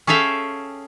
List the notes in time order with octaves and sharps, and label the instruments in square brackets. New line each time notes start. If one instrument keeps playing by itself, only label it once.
[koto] C#4 G#4 A4 E5 F5 G5